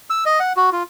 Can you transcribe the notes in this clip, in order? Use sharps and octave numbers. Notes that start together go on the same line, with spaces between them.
E6
D#5
F#5
F#4
F4